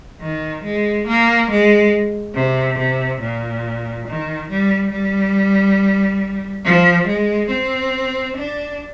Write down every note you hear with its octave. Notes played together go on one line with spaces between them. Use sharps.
D#3
G#3
A#3
G#3
C3
C3
A#2
D#3
G3
G3
F3
G#3
C4
D4